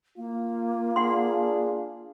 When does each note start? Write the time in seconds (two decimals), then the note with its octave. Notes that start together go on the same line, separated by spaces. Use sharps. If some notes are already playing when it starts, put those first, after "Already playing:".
0.17 A#3 F4
0.96 D4 G#4 F#5 C6